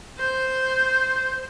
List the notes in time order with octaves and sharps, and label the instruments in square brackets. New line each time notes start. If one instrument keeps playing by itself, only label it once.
[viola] C5